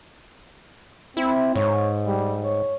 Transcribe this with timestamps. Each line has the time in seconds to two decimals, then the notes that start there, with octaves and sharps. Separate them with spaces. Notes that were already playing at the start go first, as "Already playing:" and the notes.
1.17 C4 E4
1.56 G#2 C#5
2.07 G3
2.44 C#5